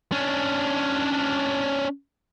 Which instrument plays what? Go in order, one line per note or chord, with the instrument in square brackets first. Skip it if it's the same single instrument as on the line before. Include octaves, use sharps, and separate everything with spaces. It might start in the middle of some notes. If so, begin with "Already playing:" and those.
[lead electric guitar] C#4 D4